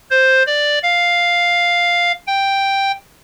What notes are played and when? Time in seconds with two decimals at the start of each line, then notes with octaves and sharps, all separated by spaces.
0.11 C5
0.46 D5
0.83 F5
2.27 G5